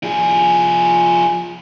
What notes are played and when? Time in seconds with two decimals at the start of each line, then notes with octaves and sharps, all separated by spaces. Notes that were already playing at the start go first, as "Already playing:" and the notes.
0.03 F3 G#4